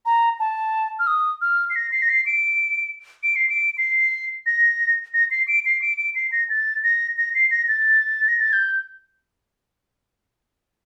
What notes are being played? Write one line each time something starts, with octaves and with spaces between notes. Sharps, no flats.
A#5
A5
F6
D#6
F6
C7
A#6
C7
A#6
C7
D7
D7
C7
D7
C7
A#6
A#6
C7
D7
C7
D7
D7
C7
A#6
A6
A#6
A#6
C7
A#6
A6
A#6
A6
G6